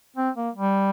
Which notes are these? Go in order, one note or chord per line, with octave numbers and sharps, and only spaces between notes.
C4
A#3
G3